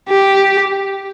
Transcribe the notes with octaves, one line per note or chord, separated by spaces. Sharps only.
G4